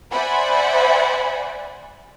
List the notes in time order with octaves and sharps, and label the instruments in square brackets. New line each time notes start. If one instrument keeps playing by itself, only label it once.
[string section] C5 D5 E5 F#5 G#5 B5